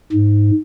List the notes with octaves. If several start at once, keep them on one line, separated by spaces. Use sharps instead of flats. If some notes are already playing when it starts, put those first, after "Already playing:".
G#2